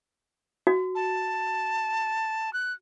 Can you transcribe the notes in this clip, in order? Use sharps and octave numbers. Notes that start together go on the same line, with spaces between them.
F#4
A5
F#6